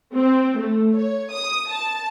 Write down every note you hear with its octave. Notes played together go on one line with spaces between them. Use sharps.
C4
A3
C#5
D#6
A5